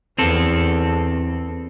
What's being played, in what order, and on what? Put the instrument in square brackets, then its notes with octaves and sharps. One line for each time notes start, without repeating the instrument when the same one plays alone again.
[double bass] E2 [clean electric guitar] C4 A4